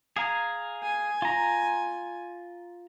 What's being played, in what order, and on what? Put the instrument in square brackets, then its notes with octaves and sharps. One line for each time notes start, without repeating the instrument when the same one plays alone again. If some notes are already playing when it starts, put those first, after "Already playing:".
[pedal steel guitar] G#4 F5 A#5
[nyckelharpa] G#5
[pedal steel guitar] F4 A#5